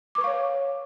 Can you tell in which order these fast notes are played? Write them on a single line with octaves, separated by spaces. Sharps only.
D6 B4 C#6 F5 C#5